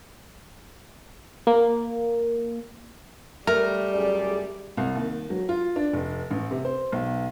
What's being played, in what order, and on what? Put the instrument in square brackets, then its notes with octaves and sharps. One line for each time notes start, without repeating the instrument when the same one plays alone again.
[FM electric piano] A#3
[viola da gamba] G3 [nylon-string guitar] A3 [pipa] A#4
[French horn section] F#2 G#4 D5
[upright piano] C2
D#2
F#3
F4
D4
F1
A1
C3
C5
B1